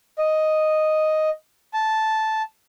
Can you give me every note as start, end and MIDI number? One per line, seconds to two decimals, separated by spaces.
0.19 1.29 75
1.74 2.42 81